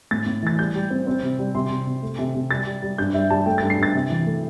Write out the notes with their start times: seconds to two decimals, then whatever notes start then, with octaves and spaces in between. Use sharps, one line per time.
0.11 A2 A6
0.26 A2
0.43 E3 A6
0.59 G3 G6
0.75 G3
0.90 C4
1.07 C4
1.22 C3
1.39 G3
1.55 C3 C6
1.70 C3
1.87 C3
2.02 A3
2.18 C3
2.35 C3
2.51 G3 A6
2.66 G3
2.83 G3
2.98 G2 G6
3.14 G3 E5
3.30 G3 A5
3.46 A3 G5
3.58 A6
3.62 G2
3.70 C7
3.78 G2 A6
3.94 C3
4.10 E3
4.26 A3